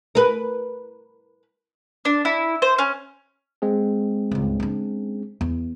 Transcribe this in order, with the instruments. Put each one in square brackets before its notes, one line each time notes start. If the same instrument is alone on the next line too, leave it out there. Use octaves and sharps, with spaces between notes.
[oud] A#4 B4
[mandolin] D4
E4
C5
C#4
[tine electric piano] G#3 C4 G#4
[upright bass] C#2 G2
C#4 D4
E2